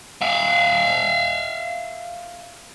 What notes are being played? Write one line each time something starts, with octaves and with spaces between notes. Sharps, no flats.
E5 F5